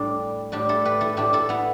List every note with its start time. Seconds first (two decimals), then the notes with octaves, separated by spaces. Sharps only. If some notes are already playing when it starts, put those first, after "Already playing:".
Already playing: A2 G3 D4
0.52 A2 G3 D4 G4
0.69 E4 A4
0.85 G4 B4
1.01 E4 A4
1.17 A2 A3 D4 G4
1.33 E4 A4
1.49 B3 E4